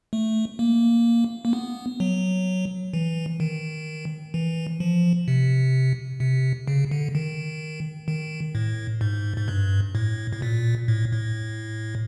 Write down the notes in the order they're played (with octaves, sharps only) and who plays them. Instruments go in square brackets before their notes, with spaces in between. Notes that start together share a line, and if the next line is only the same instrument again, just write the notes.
[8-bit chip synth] A3
A#3
A#3
B3
F#3
E3
D#3
E3
F3
C3
C3
C#3
D3
D#3
D#3
A2
G#2
G#2
G2
A2
A2
A#2
A2
A2